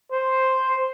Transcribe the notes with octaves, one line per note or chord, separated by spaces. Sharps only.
C5